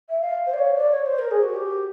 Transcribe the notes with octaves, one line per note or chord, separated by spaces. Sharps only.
E5
F5
C5
D5
C#5
D5
C#5
C5
A#4
G#4
F#4
G4